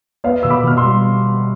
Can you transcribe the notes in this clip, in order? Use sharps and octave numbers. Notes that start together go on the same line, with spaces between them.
B3 D5 F5
B2 E6
B5 D6
B2 F6
C6 E6
G3